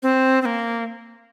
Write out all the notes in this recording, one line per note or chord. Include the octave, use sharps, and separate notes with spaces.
C4
C4
A#3